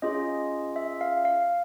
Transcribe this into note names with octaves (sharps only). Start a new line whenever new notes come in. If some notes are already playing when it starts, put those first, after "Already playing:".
C#4 F4 G#4 D#5
E5
F5
F5